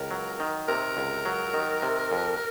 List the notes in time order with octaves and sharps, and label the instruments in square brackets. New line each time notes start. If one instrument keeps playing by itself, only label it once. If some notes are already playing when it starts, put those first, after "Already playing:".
Already playing: [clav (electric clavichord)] C#2 [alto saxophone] A#4
[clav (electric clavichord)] F#3
D#3
[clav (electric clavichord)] C3 [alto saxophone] A#4
[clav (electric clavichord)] C#2
F#3
D#3
C3
F2